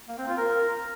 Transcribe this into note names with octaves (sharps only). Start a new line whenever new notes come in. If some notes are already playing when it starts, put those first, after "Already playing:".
A#3
C4
F4
A#4